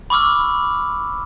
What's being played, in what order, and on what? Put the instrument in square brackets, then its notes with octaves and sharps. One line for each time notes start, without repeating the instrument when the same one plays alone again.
[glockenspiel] B5 C#6 D6 E6 F6